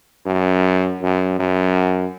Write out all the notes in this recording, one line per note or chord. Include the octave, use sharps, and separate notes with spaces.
F#2
F#2
F#2